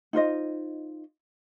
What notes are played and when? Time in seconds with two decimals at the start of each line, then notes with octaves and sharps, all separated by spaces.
0.13 D#4 F4 C5 D#5